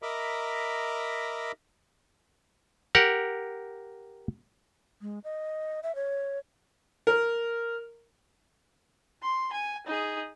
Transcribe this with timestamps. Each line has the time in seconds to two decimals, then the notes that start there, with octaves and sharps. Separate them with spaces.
0.02 A#4 D#5 E5 A#5 B5 D6
2.95 G4 A#4 F#5
5.02 G#3
5.24 D#5
5.83 E5
5.95 C#5
7.07 A#4
9.22 C6
9.52 G#5
9.86 D#4 G#4